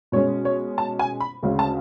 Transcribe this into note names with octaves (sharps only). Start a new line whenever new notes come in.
B2 G#3 C#4 C#5
C#5
A5
G#5
B5
D2 C#3 G#3 C#4
A5